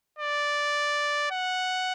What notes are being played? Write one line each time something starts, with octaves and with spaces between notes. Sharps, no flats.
D5
F#5